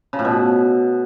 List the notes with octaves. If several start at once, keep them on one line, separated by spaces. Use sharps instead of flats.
C#3
A2
B2